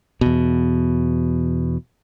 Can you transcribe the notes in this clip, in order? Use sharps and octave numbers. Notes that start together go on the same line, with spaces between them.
E2 B2